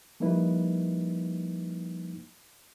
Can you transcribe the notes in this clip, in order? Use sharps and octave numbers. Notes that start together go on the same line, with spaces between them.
F3 G3 A#3 D#4 E4 B4